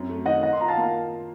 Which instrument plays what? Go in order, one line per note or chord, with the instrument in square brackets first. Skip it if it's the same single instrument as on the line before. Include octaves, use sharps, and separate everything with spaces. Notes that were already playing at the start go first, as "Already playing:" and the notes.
Already playing: [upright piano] F#2 C4
A3
[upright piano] D#3 [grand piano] D#5 F#5
[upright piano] D#3 [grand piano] D#5 F#5
[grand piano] C6
[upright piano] F4 [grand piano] A#5
[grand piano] F5 A5
[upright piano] A#3